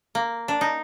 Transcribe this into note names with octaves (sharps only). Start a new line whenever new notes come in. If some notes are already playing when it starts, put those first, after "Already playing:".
A#3
D4
D#4